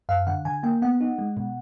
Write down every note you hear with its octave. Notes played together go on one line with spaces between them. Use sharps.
F#2 F5
D3 F#5
D3 G#5
A#3 G5
B3 F#5
D#4
G#3
B2